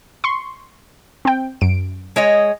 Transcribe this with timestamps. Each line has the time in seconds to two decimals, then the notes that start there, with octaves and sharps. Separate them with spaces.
0.24 C6 C#6
1.25 C4 G5
1.61 F#2 D7
2.16 G#3 C#5 D#5